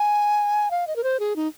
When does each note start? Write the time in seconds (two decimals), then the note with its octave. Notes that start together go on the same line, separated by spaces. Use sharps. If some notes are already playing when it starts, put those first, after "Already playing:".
Already playing: G#5
0.71 F5
0.87 D#5
0.96 A#4
1.04 C5
1.20 G#4
1.36 D#4